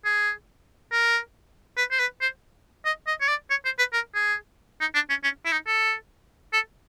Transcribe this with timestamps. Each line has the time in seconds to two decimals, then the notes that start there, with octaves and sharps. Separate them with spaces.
0.05 G#4
0.92 A#4
1.77 B4
1.91 C5
2.00 B4
2.21 C5
2.85 D#5
3.07 D#5
3.21 C#5
3.28 D5
3.50 C#5
3.65 C5
3.79 B4
3.93 A#4
4.15 G#4
4.81 D#4
4.95 D4
5.10 C#4
5.24 C#4
5.46 E4
5.52 D#4
5.67 A4
6.53 A4